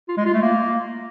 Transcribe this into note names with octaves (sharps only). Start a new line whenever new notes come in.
F4
G#3
F4
A3
A#3